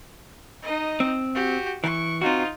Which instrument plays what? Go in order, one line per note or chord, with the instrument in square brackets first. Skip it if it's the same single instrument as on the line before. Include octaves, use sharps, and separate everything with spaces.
[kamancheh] D#4 D#5
[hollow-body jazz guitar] C4
[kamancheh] F#4 G4
[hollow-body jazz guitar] E3 [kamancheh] C#6
[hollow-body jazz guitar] C4 F#4 [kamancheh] D#4 F4